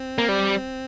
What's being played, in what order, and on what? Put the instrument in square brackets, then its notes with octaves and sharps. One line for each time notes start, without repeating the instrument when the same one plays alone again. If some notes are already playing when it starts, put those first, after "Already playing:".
Already playing: [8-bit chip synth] C4
[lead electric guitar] A#3
G3